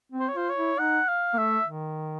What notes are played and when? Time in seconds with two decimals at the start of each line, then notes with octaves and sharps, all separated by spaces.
0.12 C4
0.20 C5
0.28 C#5
0.34 F4 C5
0.49 C#5
0.57 E4
0.79 D#4 F#5
1.08 F5
1.34 A#3
1.38 A3 E5
1.67 D#3